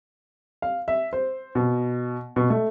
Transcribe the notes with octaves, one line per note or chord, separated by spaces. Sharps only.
F5
E5
C5
B2
B2
A3